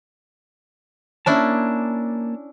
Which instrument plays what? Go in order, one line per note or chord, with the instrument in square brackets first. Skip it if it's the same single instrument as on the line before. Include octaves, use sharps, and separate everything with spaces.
[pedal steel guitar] A#3 A5 [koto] C#4 D4 E4